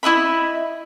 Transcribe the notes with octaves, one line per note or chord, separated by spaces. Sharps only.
E4 D#5 E5 B5